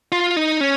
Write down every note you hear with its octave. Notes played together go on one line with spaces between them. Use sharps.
F4
D#4
C#4